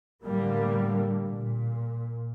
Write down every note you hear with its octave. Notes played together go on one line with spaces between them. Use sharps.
A2 D3 G3 A#3
A#2